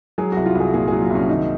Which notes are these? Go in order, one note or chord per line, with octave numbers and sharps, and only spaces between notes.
F#3 G#4
C2 F#4
F4
C2 G#4
A#2 G#4
F#3 G#4
F4
C2 C#4
D#3 D#4